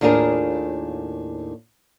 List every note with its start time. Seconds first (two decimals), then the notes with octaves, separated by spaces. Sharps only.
0.01 D#2 A2 D4 F4 G#4 A#4